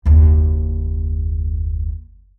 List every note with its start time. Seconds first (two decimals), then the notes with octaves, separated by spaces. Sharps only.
0.06 F#1 D#2